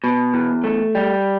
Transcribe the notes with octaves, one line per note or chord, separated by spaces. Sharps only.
B2
E2
A3
G3